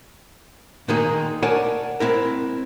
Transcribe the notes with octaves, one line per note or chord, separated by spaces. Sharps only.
A#2 D#3 G#3 A#3 D#4 G#4
A#4 C#5 D5 F#5 G#5 A5
G#3 C4 E4 A#4